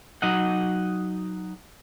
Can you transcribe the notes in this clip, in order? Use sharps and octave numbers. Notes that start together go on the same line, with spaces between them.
F#3 D#4 D#5 F#5